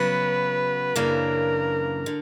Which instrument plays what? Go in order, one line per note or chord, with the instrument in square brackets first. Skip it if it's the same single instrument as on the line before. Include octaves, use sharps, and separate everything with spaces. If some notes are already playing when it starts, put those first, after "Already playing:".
Already playing: [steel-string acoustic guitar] C#3 F#3 B3 F#4 [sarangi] B4
[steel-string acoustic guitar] F#2 C#3 E3 A#3 D4 [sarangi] A#4
[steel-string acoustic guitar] D3